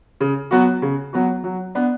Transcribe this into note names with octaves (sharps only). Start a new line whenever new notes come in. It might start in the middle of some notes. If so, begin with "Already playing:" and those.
C#3
F#3 B3 F#4
C#3
F#3 B3 F#4
F#3
B3 D4